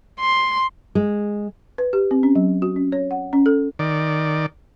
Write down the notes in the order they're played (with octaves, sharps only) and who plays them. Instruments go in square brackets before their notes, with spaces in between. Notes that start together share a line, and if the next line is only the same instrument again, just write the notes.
[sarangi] C6
[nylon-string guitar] G#3
[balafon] B4
G4
C4
C#4
F#3
F#4
C#4
C#5
F#5
C#4
A4
[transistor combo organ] D#3 D5